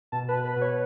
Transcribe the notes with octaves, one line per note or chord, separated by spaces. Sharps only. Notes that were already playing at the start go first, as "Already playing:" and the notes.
B2 A5
B4
B2
B4
B2
C#5